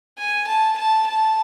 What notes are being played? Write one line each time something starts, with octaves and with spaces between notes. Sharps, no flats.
G#5
A5
A5
A5